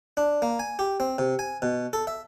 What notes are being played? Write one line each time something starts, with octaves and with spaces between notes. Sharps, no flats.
D4
A#3
G#5
G4
C4
C3
G#5
B2
A4
E5